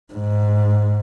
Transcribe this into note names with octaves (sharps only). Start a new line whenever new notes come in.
G#2